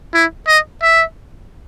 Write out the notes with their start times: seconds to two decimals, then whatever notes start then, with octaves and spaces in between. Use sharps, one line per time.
0.14 E4
0.48 D#5
0.82 E5